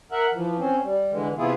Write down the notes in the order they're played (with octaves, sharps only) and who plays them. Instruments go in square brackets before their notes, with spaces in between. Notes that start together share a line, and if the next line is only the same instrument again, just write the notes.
[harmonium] A#4 E5 F#5
E3 F3
C4 C#4
G3
D3 E3 G#3
C3 E3 B3 E4 F4 G#4